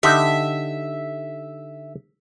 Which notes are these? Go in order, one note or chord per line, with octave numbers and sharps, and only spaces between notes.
D3 D#4 G4 E5